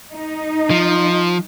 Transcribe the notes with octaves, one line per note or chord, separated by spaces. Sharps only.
D#4
F3